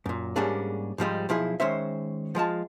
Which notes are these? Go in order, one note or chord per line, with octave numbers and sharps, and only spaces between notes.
F#2 A#2
G#2 G3 A#3 C#4 D4 G#4
G#2 F3 G3 G#3
B1 F3 E4 G#4
D#3 G#3 C#4 C5 E5
F3 G#3 F4 A5